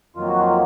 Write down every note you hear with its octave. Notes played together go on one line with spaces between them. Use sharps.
F2 D#3 F#3 A#3 F4
F#4
F4